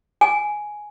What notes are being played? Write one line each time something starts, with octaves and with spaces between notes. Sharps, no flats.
G#5